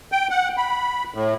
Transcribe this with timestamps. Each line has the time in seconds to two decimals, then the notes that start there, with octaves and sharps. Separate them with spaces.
0.12 G5
0.30 F#5
0.57 B5
1.14 A2